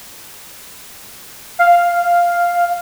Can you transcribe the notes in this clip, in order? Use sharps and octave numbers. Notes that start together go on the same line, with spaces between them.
F5